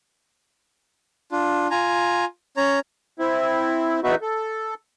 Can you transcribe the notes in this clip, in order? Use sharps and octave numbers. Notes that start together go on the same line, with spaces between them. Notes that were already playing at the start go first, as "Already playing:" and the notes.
D4 F4
F4 G#5 A#5
C#4 C#5 A#5
C4 E4
E2 B3 D#4 F#4 B4 E5
A4